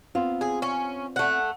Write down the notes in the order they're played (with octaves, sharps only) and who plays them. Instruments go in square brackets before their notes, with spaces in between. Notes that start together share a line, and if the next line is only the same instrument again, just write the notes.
[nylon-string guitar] B3 C4 F4
[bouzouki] G#4
C#4
A3 F#5